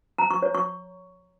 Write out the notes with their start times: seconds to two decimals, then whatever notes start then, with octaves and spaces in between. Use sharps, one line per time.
0.18 A#5
0.30 C#6
0.42 C#5
0.54 C#6